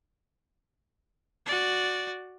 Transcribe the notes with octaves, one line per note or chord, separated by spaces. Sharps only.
F#4 D5